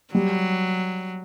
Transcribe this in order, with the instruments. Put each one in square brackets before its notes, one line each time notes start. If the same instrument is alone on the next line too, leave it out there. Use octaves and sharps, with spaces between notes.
[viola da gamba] F#3 [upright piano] G3